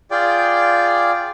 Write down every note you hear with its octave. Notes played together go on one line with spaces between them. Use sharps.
F4 G#4 D5 G5